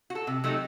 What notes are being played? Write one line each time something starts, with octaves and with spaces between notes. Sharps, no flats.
F#4
A4
C3
F#3 A3 D#4 G4